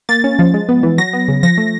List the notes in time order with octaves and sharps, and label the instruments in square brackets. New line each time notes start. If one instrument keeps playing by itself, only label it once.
[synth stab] A#3 A6
C#4
F3
G#3
B3
E3
F#3 A#6
B3
C#3
F3 A#6
A3